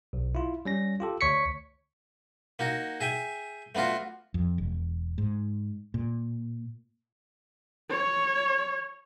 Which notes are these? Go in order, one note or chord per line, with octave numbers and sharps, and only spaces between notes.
B1
E4 F4
G3 C#4 A#6
F4 G4 A4
D2 C#5 C#6 B6 C#7
A#3 D#4 F#4
G#4 E5 G5 G#5
A3 B3 D4 F4 F#4
F2
E1
G#2
A#2
C#5